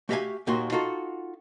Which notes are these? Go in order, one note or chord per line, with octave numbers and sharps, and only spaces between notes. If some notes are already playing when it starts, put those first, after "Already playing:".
A3 F#4 G4 E5 F5 G#5
D#2 A#2 D#3 F#4 C6
D#4 F4 F#4 A4